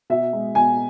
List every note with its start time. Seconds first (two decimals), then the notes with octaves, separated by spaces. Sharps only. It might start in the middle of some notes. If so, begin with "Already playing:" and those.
0.10 B2 E5
0.33 G#3
0.55 B2 G#5